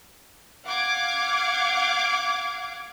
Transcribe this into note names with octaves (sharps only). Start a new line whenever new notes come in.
F5 F#5 D6 G#6